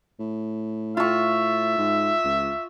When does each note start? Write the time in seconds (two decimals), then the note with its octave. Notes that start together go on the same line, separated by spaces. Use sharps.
0.20 A2
0.97 F4 E5 C#6
1.78 G#2
2.24 C#2